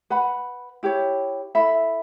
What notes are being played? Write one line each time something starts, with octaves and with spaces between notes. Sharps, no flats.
B4 F#5 B5
E4 G4 C#5
E4 A4 E5 B5